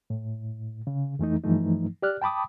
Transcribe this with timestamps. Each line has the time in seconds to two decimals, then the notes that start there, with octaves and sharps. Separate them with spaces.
0.10 A2
0.87 C#3
1.19 F2 E3 A3 D#4
1.44 G2 E3 F3 A3 D#4
2.02 G4 D5 F6 F#6
2.22 G5 A5 B5 D6 D#6